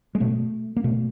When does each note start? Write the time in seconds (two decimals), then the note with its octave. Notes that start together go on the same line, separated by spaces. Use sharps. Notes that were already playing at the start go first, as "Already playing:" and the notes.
0.15 G#3
0.20 B2 A3
0.77 A#3
0.84 B2 A3